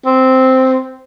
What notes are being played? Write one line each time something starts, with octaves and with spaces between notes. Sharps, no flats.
C4